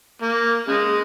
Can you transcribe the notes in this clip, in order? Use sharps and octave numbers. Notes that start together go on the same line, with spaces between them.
A#3
C#3 G#3